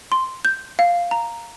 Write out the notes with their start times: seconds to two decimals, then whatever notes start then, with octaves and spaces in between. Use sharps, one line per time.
0.12 C6
0.45 G6
0.79 F5
1.11 A#5